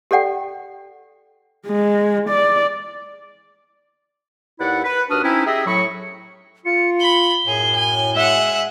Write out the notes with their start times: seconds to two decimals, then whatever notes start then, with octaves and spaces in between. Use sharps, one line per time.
0.11 G4 A4 D5 F#5 G5
1.67 G#3
2.29 D5
4.59 D#2 E4 B4 D5 F#5
4.84 B4
5.10 D#2 D4 F#4 B4 D#6 F6
5.23 C4 C#4 D#4 E4
5.46 G4 G#4 D#5 E5
5.67 A2 F#3 B5 C#6
6.66 F4 C#7
7.00 B5 G7
7.47 F#2 A2 G#4
7.75 G#5
8.15 G#3 E5 F#5